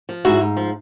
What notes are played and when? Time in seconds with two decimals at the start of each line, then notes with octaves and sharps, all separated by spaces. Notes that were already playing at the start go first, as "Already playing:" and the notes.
0.09 F3
0.25 G#2 E4 F#4
0.40 G#2
0.57 F3